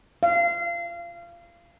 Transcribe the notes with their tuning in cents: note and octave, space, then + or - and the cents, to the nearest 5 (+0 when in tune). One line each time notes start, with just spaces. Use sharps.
F5 -25